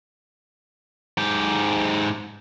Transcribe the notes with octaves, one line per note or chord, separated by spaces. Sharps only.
G#2 G4